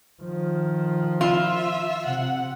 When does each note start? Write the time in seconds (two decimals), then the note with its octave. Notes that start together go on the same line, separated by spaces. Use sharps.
0.22 D#3 F3
1.21 F4 E5
2.06 C3 F#5